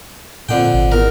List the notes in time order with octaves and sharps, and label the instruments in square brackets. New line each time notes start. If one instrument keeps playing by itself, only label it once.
[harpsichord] F2 D3 G5 [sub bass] A#2
[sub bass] G#1
[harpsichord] E2 A#4